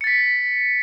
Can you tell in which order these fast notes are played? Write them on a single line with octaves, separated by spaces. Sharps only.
C#7 A6 B6